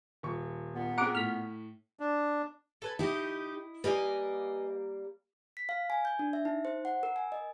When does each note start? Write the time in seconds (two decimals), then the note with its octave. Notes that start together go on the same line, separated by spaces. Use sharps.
0.23 D#1 C#6
0.75 A#2 B3
0.98 C4 G#4 F#5 A#5 D6
1.15 A2 F6 B6
2.00 D4
2.82 A4 B4 G#5
2.99 D#4 E4 G4 D#5
3.84 G3 A#3 B4 D#5 G#5
5.57 B6
5.69 F5
5.90 G#5
6.05 G6
6.19 D4
6.33 E5
6.45 D#4
6.65 C5
6.85 F#5
7.03 A#4
7.16 G#5
7.32 D#5